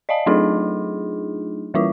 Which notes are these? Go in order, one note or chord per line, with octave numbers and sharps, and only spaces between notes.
D5 D#5 F5 A5
F#3 A3 D4 D#4 F4 G#4
E3 G3 E4 F4